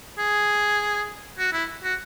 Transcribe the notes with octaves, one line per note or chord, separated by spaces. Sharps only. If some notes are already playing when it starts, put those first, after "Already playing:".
G#4
F#4
E4
F#4